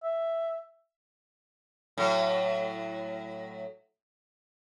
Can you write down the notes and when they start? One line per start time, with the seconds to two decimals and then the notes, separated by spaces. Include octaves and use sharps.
0.03 E5
1.98 A2 F#3